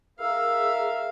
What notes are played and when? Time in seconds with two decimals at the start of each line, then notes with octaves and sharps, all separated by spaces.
0.20 E4 G#4 A#4 E5 F5 E6